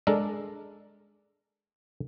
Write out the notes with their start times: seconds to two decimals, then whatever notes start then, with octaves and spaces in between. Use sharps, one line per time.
0.07 G#3 D4 A4 A#4 D5